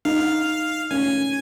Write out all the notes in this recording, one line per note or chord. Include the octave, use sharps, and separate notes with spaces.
D#4 F5
C#4 G#5